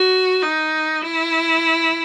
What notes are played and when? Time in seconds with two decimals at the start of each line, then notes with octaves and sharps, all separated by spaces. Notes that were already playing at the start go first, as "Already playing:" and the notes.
Already playing: F#4
0.42 D#4
1.01 E4